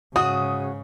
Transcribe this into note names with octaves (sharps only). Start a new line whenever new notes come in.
G#2 C#3 F#4 D#6